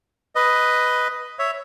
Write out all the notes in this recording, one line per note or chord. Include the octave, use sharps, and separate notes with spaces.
B4 D#5
C#5 E5